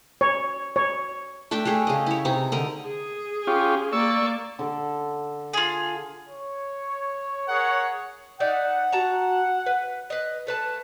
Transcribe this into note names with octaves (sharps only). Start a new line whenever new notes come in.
C#5
C#5
A3 D4 E5 G5
A3 G4 G#4
C#3 D#5
E4 C#5
C3 D#4
D3 A#4 D#5
G#4
C#4 F4 G4
A#3 D5 C#6 E6
D3 A4
F4 G#4
C#5
G#4 A#4 C#5 F#5
D#4 D5 E5 F#5
F#4 A5 A#5
B4
B4 D#5
A3 B4 A5